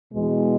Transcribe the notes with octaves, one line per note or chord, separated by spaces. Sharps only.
E2 B2 G#3